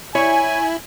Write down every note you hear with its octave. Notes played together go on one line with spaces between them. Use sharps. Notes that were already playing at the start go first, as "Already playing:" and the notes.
E4 C#5 G#5